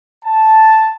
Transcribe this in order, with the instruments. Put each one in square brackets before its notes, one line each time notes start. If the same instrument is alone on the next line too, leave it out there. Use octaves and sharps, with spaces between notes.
[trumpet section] A5